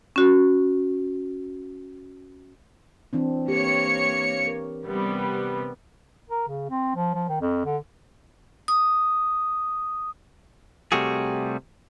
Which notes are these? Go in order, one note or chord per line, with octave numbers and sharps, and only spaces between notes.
C#4 F#4
E3 C4 D4
A#3 G4 B4 C#5 C#7
A#4
C3 G3 B3
A#4
C#3
C4
F3
F3
D#3
F2
D3
D#6
C3 G3 A3 F#4 G#4